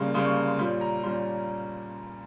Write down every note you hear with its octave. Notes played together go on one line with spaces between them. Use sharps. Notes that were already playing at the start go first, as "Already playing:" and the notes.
Already playing: C#3 G3 A#3 C6
C#3 G3 A#3 C6
C#6
C6
C6
A#2 G3 C#4 C6
A#5
A#2 G3 C#4 C6